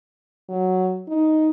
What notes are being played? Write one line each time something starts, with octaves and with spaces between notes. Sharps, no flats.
F#3
D#4